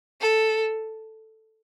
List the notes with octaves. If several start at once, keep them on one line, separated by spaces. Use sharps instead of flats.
A4